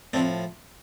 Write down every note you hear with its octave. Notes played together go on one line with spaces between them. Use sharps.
A2 F3 C4 D4